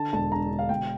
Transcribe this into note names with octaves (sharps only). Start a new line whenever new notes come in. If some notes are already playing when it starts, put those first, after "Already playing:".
Already playing: D3 A5
E1 A5
D3 A#5
D3
F5
E1 G5